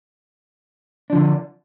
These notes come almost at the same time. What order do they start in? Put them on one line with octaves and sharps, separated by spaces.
D4 F3 D3